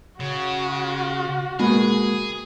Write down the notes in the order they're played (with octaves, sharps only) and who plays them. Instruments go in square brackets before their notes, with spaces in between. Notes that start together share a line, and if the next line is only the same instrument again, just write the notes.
[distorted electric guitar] C#3 [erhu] F#4
[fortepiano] B2 [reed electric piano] G#3 A#3 A#4 [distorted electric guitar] G#4